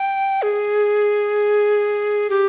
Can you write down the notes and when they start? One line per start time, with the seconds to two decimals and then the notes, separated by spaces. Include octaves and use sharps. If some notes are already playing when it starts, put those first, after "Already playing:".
Already playing: G5
0.42 G#4
2.30 G4